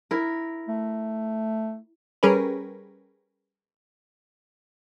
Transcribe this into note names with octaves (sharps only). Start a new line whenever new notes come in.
E4 A#4
A3
G3 C#4 G#4 A#4 B4